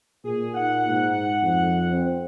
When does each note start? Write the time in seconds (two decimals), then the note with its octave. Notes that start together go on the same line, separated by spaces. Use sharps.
0.24 A#2 G#4
0.54 D#4 F#5
0.89 G#2
1.43 F2
1.91 C4